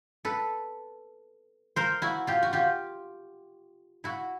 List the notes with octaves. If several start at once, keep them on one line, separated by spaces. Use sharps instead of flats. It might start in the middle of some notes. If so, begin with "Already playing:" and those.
A4 B4
A#4 C5
E4 F#4
F4 G4
F#4
F4 G4
E4 F#4